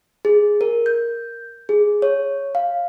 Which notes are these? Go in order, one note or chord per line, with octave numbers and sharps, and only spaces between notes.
G#4
A#4
G6
G#4
C#5
F5